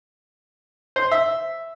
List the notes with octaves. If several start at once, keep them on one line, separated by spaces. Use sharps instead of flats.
C5
E5